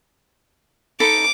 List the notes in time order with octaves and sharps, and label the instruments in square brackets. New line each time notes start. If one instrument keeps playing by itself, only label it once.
[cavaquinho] D#4 A4 B5 [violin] D6